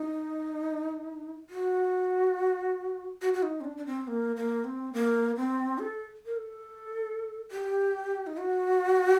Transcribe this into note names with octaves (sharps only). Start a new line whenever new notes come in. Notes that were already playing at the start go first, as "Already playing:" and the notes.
Already playing: D#4
F#4
F#4
F#4
D#4
C4
D4
D4
C4
A#3
A#3
C4
A#3
C4
A4
A#4
A4
G4
D#4
F#4